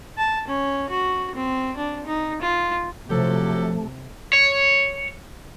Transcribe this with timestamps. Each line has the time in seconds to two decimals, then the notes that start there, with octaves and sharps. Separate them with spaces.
0.18 A5
0.48 C#4
0.90 F#4
1.35 C4
1.77 D4
2.06 D#4
2.41 F4
3.10 C3 F3 F#3 A3 G4 A4
4.33 C#5